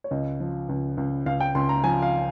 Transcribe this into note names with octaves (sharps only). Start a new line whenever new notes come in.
C#5
C#2 D#5
F3
C#2
C#2
C#2 F5
G5
C#2 C6
A#5
F3 G#5
F5